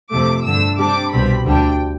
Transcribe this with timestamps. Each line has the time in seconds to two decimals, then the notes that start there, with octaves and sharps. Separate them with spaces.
0.11 F2 C3 F3 A3 D6
0.44 G2 D3 A3 E6
0.78 C3 G3 D4 D6
1.12 C2 B2 G3 C4 B5
1.46 D2 D3 G3 D4 G5